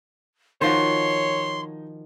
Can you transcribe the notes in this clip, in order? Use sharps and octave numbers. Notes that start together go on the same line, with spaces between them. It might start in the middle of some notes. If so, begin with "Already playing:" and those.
D#3 F3 D#4 F#4 C#5 C6